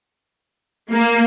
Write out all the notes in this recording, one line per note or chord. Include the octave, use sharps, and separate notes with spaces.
A#3